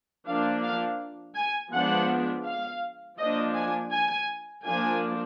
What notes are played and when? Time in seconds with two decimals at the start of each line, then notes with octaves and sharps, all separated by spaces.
0.25 F3 A#3 D4 F5
0.62 F5
1.35 G#5
1.72 F3 G#3 B3 D4 F#5
2.45 F5
3.18 F3 A#3 D4 D#5
3.55 G#5
3.92 G#5
4.64 F3 A#3 D4 G#5